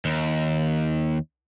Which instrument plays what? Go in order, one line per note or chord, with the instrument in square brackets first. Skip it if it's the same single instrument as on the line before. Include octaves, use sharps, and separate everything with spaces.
[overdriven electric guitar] D#2